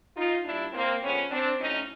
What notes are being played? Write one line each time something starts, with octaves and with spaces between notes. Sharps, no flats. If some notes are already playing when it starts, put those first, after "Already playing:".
D#4 F4
A#2 G3 D4 E4
A#3 C4
D3 F3 G#3 B3 C#4
C4 D4
A2 F#3 C#4 D#4